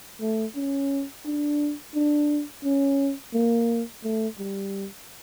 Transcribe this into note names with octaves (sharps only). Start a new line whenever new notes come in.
A3
C#4
D4
D4
C#4
A#3
A3
G3